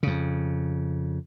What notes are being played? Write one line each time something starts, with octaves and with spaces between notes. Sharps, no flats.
F2 C#3